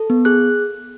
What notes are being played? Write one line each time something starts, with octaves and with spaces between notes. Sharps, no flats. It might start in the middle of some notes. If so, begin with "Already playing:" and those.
Already playing: A4
B3
G#4 F#6